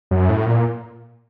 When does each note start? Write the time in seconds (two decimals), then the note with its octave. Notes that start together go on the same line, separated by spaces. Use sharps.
0.11 F#2
0.29 A2
0.46 A#2